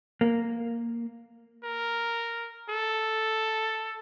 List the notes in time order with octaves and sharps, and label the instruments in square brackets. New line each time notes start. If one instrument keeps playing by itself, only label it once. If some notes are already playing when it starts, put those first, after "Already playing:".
[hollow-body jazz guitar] A#3
[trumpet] A#4
A4